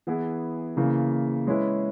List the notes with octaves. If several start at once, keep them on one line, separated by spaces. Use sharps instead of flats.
E3 B3 E4 G#4
C#3 E3 A#3
G#3 C#4 E4 B4